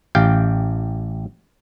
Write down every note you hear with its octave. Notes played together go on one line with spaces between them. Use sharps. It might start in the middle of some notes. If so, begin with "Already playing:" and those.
A1 G4 F5 G5